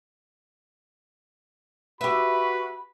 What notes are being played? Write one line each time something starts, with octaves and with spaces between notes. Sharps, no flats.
F#4 G4 B4 E5 B5